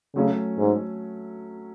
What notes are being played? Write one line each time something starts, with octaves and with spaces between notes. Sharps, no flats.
C#3 F#3 A3 C#4
G#2